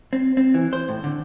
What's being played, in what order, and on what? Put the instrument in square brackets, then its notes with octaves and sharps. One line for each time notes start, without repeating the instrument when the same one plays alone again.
[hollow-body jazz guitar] C4
C4
E3
C5
A2
D3